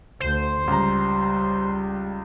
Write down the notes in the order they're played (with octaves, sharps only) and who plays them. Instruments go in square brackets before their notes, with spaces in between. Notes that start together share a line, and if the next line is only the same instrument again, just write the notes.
[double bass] D2 [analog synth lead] C5
[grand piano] C#2 A#5 [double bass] G3